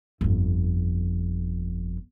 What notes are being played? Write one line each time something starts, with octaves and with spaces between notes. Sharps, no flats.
G1 F2